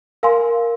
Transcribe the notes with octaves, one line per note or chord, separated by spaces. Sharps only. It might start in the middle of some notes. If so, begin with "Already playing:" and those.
A#4 F5 G#5 C6